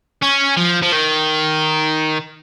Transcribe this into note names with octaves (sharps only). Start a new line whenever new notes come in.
C#4
F3
F3
D#3